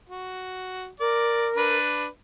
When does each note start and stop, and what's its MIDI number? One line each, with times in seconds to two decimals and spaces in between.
0.09 0.88 66
1.00 1.77 70
1.00 1.47 74
1.56 2.07 62
1.56 2.07 71